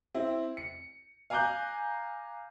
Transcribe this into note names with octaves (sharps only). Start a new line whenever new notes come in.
C4 E4
C#7
F5 G#5 A#5 D6 F#6 G6